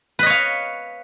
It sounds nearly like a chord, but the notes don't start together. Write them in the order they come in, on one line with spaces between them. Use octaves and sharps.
B4 D#5 C#5 F5